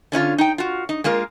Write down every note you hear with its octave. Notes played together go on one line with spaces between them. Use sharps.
D3 C#4 D#4 F4
D#4 G5
F4 F#4
D#4
G#3 A#3 F4 A#4